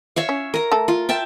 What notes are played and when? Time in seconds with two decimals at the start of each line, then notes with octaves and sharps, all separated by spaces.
0.16 C#5 E5 F5
0.29 C#4
0.54 A#4 A#5
0.72 A3 A4
0.88 F4
1.09 E5 G5 A5